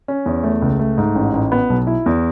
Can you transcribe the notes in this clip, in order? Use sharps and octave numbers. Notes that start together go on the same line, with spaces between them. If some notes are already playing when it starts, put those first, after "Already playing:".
C#4
E2
A3
C#2
A3
G#2
A1
A1
B3
B1
E4
E2